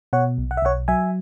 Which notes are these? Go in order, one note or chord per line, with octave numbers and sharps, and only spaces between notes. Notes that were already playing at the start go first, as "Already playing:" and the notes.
B2 C#5 F#5
B1
F#5
E5
B1 C#5 F#5
F#3 E5 G#5